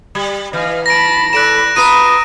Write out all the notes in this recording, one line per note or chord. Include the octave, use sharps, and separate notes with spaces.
G3
E3 D#5 F5
A5 B5 A#6 D7
A4 D5 B5 F#6 D7 E7
F4 B4 A#5 D#6 D#7